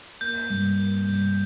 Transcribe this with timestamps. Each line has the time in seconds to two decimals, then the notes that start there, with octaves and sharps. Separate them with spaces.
0.21 A#3 G6
0.50 G2
0.79 A#3
1.08 G2